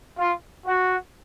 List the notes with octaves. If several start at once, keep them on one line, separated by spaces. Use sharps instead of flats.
F4
F#4